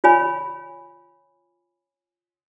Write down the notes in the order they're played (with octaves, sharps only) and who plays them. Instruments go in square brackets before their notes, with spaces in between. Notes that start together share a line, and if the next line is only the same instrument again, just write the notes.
[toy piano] F4 C#5 G#5 B5